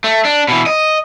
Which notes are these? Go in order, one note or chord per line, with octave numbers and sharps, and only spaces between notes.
A3
D4
B2 E3
D#5